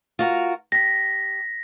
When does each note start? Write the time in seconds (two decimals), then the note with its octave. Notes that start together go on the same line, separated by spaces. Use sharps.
0.19 F4 F#4 A#4
0.72 G4 A#6 B6